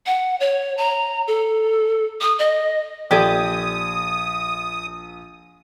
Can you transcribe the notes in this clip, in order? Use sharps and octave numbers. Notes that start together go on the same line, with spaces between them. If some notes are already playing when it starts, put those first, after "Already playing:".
F#5
C#5
A#5
A4
D#6
D#5
A#1 G4 A4 D5 D#6 G#6